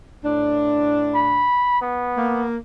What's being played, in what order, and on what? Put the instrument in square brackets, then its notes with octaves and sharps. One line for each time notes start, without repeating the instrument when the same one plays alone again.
[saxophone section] A2 D4
[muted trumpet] B5
B3
[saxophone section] A#3